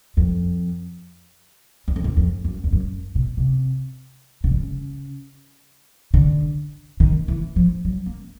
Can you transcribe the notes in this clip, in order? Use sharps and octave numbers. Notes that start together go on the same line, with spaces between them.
F2
E2
F2
E2
F2
F#2
F2
F#2
B2
C3
C#3
D3
C#3
D3
D#3
E3
F3
F#3
A#3